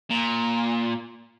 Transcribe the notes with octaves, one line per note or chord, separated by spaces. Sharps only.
A#2